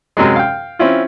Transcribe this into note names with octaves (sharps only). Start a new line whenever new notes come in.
F#2 C3 F#3 G#3
F5 G5
C4 C#4 E4 F4